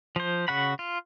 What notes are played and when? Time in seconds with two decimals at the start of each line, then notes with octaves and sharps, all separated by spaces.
0.16 F3 C5
0.48 C#3 F#4 F#5 B5
0.79 F4